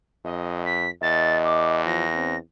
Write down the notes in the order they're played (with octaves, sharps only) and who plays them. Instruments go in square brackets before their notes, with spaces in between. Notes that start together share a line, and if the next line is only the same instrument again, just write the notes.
[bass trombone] F2 [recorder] D#5
[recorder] B6
[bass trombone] E2 [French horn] D#5 [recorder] A6
[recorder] D6
[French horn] F3 [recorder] A#6
[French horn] C4